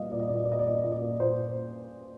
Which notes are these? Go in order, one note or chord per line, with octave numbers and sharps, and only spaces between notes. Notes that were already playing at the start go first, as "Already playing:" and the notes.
Already playing: A#2 G3 A#3 D#5 F5
A#2 D5
D#5
A#2 D5
D#5
D5
A#3 D#5
D5
A#2 D#5
D5
A#2 D#5
D5
A#3
A#2 C5